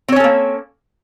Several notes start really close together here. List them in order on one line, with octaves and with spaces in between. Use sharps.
C4 C#5 C#4 A4 A#3